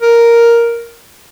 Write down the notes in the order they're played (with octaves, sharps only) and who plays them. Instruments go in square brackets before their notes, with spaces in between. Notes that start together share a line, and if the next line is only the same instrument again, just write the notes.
[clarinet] A#4